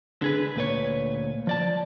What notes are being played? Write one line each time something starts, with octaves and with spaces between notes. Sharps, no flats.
D3 G#4 B4
D2 A#2 B4 C#5
F3 D5 A5